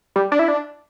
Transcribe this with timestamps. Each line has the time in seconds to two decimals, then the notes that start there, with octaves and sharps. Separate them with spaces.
0.16 G3
0.32 D4
0.39 E4
0.48 D4